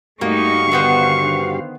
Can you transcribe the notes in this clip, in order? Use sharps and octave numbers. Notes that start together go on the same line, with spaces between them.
G2 A3 A#3 D#4 F#4 G4 C#6
D3 D#3 B3 C5 F5